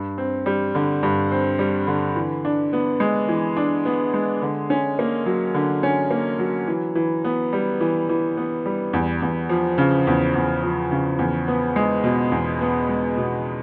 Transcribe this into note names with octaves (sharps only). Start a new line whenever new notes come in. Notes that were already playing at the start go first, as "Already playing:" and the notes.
Already playing: G2
C4
G3
D3
G2
C4
G3
D3
E3
D4
B3
G#3
E3
D4
B3
G#3
D3
C#4
A#3
F#3
D3
C#4
A#3
F#3
E3
E3
B3
G3
E3
E3
B3
G3
E2
E2
F3
C#3
E2
E2
F3
C#3
E2
B3
G#3
B2
E2
B3
G#3
B2